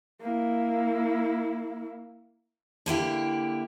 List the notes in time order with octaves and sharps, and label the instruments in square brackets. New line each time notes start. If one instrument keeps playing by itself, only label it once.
[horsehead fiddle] A#3 E4
[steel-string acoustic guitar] D3 A#3 E4 G4